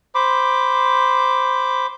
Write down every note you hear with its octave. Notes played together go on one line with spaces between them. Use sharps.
C5 B5 D6